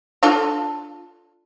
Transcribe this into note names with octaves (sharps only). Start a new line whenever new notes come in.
D4 F4 A4